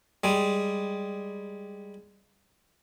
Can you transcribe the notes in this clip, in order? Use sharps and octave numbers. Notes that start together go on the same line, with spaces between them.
G3 G#3